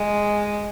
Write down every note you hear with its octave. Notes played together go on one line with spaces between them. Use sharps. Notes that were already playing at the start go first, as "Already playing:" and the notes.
Already playing: G#3